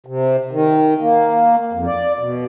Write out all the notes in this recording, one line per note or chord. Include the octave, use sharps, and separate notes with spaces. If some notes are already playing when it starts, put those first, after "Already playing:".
C3
D#3
A#3
F2
D5
B2